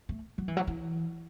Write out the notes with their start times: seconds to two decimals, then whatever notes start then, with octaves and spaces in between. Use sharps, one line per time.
0.09 A3
0.38 F#3
0.48 E3
0.57 F#3
0.67 E3